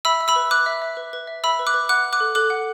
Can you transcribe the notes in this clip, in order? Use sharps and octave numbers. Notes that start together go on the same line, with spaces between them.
E5 B5 E6
E5
B5 E6
B4
B4 D6 F#6
E5
E5
B4
B4
E5
E5 B5 E6
B4
D6 F#6
B4
F#5 D6 F#6
F#5
D6 F#6
A4
A4 D6 F#6
F#5